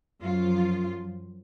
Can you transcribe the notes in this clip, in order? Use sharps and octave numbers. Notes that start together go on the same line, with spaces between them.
F#2 F3 F4